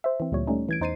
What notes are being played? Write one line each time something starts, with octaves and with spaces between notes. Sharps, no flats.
C5 E5
E3 C4
D2 A#2 G3 C#5
G3 A3 C#4 D#4
E3 G#6 D7
E2 D#4 C5 A6 C7 D#7